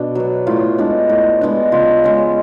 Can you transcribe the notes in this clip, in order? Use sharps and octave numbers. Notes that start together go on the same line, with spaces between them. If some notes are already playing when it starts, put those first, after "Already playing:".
Already playing: B2 D4
F#3 B3
A2 F4
G#3 B3 D4
A2
G#3 B3 D4
C#3 F4
G#3 C#4